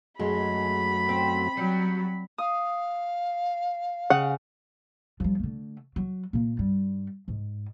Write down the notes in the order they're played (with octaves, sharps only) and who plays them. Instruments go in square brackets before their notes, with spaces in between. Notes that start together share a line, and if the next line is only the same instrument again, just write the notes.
[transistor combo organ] F#2 F#3 A3 [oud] G#3 [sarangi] B5
[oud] C4
[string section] F#3 [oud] G3
[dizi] F5 [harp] D#6
[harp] C#3 [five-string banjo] F#5
[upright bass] F3 G3
D3 A3
F#3
A#2 A#3
G2 G3
G#2